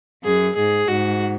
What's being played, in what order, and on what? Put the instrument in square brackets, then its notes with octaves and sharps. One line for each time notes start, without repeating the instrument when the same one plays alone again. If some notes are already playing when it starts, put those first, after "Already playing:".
[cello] F#2 [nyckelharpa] G#4
[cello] G#2 [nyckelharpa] G#4
[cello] G#2 [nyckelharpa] F#4